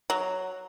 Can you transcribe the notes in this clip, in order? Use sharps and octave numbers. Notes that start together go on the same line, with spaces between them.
F#3